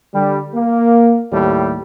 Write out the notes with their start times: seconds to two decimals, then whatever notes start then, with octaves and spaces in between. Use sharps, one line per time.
0.14 D3 G3
0.55 A#3
1.32 D#2 A2 G3